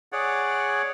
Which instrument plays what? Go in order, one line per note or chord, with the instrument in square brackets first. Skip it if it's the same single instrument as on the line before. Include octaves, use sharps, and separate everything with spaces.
[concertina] G#4 C#5 D5 F#5